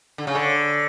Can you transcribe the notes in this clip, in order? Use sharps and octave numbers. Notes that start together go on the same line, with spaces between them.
D3
C#3
D3